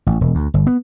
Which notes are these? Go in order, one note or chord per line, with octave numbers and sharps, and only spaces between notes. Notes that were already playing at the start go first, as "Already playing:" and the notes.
A1
E1
D2
G1
B3